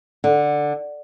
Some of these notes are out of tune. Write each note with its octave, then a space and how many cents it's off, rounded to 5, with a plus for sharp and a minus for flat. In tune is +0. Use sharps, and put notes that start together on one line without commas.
D3 +5